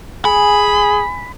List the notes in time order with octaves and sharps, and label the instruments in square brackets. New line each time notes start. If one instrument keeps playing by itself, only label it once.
[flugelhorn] G#4 [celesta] G#5 [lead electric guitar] B5